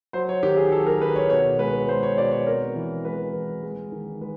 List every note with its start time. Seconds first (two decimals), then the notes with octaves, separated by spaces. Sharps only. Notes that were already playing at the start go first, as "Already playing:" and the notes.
0.13 F#3 C5
0.29 C#5
0.43 D#3 G4
0.57 G#4
0.72 F#3 A4
0.86 A#4
1.01 D#3 B4
1.16 C#5
1.30 B2 C#5
1.59 G#3 B4
1.88 G#3 C5
2.03 C#5
2.18 B2 D5
2.32 C#5
2.47 C4 A#4
2.76 E3
3.05 G#3 B4
3.34 E3
3.63 G#3
3.92 D#3
4.21 G#3 B4